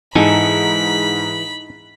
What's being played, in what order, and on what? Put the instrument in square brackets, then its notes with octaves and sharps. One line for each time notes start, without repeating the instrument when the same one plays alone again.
[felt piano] G#2 [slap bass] E3 [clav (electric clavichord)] D#4 A4 G#5 [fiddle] B5